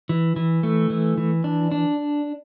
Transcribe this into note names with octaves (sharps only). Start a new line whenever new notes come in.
E3
E3
A3
E3
E3
D4
D4